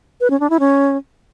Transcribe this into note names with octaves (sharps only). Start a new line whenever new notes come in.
B4
C#4
D4
E4
C#4